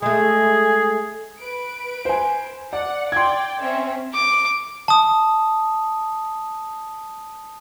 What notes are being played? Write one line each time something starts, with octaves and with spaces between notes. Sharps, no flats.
G#3 A3 G#4
B4 D7
C5 G#5
D5 F#5
D5 G5 C6 G#6
C4 C#4 E5
D6
A5 D#6